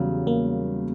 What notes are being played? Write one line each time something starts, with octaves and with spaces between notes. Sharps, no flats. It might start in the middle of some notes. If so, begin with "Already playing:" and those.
Already playing: E2 C#3 F#3 G3
A#3